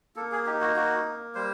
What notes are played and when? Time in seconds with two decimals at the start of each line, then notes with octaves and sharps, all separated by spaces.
0.16 A#3 A4
0.32 G#4
0.46 D#4 G4
0.61 F#4
0.76 A#3 F#4
1.05 A#3
1.35 G3 C5